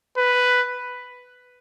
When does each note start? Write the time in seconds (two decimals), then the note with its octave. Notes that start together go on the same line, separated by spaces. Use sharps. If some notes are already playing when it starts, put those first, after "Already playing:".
0.17 B4